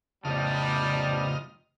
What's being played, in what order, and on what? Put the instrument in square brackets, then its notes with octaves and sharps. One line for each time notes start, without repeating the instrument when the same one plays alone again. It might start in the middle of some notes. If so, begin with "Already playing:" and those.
[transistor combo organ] F2 D#5 F6 [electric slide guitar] A2 C#3 [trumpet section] G3 [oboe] A5